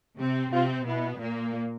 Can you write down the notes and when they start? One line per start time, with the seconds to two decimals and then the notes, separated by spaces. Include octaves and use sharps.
0.19 C3 C4
0.53 C3 C4 F4
0.86 B2 B3 E4
1.20 A#2 A#3